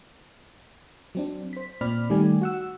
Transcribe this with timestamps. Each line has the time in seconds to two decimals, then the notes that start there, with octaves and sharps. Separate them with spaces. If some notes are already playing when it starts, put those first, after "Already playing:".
1.15 F#3 C4 D4
1.53 C5 B6
1.81 A#2 C4 D5 B5 F6
2.10 D#3 G3 A3 G4 D5 G#5
2.41 F#4 F#5 E6